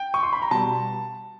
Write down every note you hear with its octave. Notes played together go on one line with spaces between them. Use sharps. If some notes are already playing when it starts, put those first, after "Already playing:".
Already playing: G5
C#6
C6
B5
A#5
B2 G3 A5